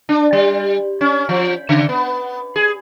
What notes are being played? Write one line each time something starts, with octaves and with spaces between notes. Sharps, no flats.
D4
G3
C#4
F3
C#3
B3
G#4